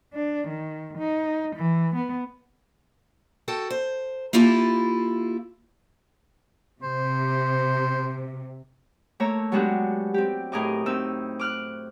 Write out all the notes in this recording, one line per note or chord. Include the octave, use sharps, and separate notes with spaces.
D4
D#3
D#4
E3
B3
F#4 A4 G5
C5
A#3 E4 F4 G4 A4
C3 C5
A3 A#3 C#5 A#5 E6
F#3 G#3 B3 D4 F#4 G4
C4 G4
A2 G#4 A#4 D#5 D6
A2 C4 D#4 E6
D6 F6 F#6